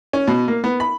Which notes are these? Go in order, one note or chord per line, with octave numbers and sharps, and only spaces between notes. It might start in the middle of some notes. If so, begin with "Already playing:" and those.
C#4
B2
A#3
B3
B5